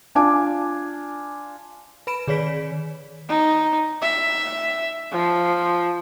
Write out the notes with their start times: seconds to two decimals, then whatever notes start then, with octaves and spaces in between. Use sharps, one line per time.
0.15 D4 F4 G#5 A5 D6
2.07 B4 B5 D7 E7
2.28 D#3 G#4 C#5 D5 B6
3.29 D#4
4.02 E5
5.12 F3